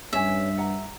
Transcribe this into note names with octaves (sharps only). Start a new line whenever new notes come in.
G2 C#4 C#5 E5 G#5
F#5 A#5